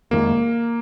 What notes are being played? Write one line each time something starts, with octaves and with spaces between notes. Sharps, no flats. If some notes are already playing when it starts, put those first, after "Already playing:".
F1 F2 D#3 G#3 A#3